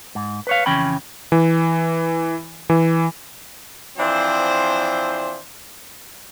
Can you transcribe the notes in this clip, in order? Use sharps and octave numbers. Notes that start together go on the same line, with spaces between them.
G#2
B4 C#5 F5
F2 C#3 E3 C#4 G5 B5
E3
E3
E3 F3 C4 D4 C5